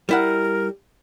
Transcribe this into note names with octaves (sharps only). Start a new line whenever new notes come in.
G3 E4 A#4 F#5